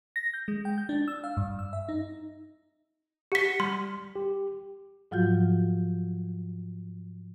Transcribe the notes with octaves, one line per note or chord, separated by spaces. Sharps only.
A#6
G6
G#3
G5
G6
D4
E6
F5
G2
E6
E5
D#4
G4 F#5 B6 C#7
G3 C6
G4
G#2 F3 F#3 F4 F#4 G6